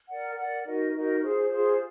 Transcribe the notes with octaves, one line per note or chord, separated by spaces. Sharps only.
A#4 D5 F#5
A#4 D5 F#5
D#4 F#4 A#4 D#5
D#4 F#4 A#4 D#5
F4 G#4 C5
F4 G#4 C5